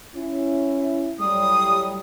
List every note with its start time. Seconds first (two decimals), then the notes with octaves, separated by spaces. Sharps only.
0.15 C#4 E4
1.19 A2 F#3 G3 D#6